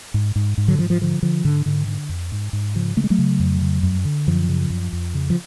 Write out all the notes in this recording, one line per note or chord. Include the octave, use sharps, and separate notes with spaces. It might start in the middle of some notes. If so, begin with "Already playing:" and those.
G#2
G#2
G#2
D3 F#3
G#2 F3
F3
D3 F3
D3 F3
G#2 D3
G#2 D3
D3
F2
G#2
G#2
C#3 F3
C#3 A3
G#3
F#3 A3
C#3
F2
C#3
F#2
D3
F#2 F3
C#3
F#2
F2
C#3
F3